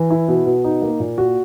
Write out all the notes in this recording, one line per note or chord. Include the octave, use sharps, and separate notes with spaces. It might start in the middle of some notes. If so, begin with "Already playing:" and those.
Already playing: E3
E4
B2
B2
D#4
A#3
A#2
F#4